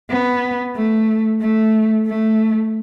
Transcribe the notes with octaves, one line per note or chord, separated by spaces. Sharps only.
B3
A3
A3
A3